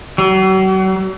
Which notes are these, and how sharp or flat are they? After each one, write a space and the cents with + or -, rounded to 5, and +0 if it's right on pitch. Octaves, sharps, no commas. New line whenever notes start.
F#3 +40